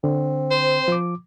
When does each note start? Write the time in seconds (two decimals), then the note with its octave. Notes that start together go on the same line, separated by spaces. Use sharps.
0.04 D3 C4
0.51 C5
0.88 F3 D6